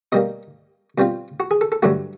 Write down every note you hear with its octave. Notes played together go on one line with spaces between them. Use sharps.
B2 G3 A#3 D#5
B2 G3 C4 F4
F#4
G#4
A4
A4
G2 D3 F#3 A3 F#4